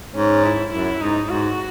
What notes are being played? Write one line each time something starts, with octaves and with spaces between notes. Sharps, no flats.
G#2 C#4
E4
F#2 E4
G#2 D#4
G#2 F#4